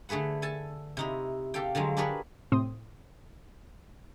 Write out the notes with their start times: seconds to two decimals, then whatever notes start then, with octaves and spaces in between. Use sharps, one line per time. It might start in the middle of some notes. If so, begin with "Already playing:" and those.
0.09 D3 A3 G#4 B4 F#5
0.42 A4 G#5 A5
0.97 C3 D#4 E4
1.54 G4 A4 F5 G5
1.75 D3 F3 F#3 G#3
1.97 D4 G4 G#4 A#4 B4 C#5
2.52 A2 C3 C4 C6 D#6